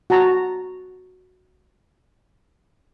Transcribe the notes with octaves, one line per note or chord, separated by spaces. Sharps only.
F#4 A5 A#5